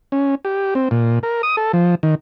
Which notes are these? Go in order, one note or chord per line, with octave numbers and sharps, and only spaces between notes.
C#4
G4
C4
A#2
A#4
D#6
A4
F3
D#3